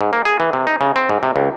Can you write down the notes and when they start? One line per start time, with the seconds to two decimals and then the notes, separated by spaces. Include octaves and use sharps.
0.01 G#2
0.13 A#3
0.25 G#4
0.40 E3
0.53 C3
0.67 D#4
0.81 C#3
0.96 C4
1.09 G#2
1.23 C3
1.36 C#2